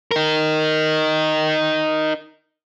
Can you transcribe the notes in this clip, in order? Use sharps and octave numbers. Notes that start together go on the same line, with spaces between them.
D#4 A#4